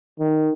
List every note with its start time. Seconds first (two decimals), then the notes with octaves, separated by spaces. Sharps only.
0.19 D#3